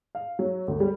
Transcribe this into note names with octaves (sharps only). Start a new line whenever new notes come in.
F5
F#3
D2
G3